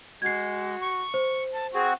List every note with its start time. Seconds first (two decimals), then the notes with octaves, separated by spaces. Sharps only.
0.22 G#3 F#4 G#6 C7
0.82 C#6
1.14 C5
1.53 A5
1.74 C4 F#4 G#4